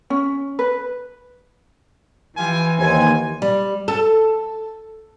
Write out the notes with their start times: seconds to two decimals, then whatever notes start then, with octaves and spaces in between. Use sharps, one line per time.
0.10 C#4
0.59 B4
2.38 E3 F4 G4 G#5
2.79 D#2 C5 G#5
3.42 G3
3.88 A4